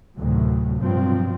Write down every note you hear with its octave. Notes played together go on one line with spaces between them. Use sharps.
D2 A2 C3 D#3 F#3
G2 B2 F3 F#3 C4